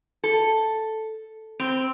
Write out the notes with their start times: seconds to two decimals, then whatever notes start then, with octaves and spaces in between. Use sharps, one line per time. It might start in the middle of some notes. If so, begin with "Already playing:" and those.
0.24 A4
1.60 C4